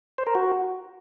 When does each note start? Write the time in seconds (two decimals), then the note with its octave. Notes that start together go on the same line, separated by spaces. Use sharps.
0.18 C5
0.27 A#4
0.35 F#4